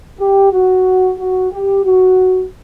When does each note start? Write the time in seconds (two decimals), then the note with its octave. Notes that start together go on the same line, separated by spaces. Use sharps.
0.19 G4
0.52 F#4
1.18 F#4
1.51 G4
1.84 F#4